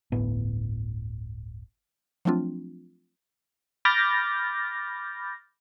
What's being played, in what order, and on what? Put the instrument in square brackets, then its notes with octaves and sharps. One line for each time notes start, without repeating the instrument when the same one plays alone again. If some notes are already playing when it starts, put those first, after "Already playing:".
[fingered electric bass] D1 G1 A2 B3
[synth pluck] F3 F#3 A3 C4 D4 F4
[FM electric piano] B5 D6 F6 G6 A6 A#6